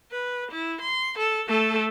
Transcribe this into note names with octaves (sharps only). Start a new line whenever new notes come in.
B4
E4
C6
A4
A3 A4